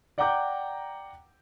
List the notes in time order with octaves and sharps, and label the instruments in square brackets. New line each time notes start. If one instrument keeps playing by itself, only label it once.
[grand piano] D5 F#5 G5 A#5 D6 G6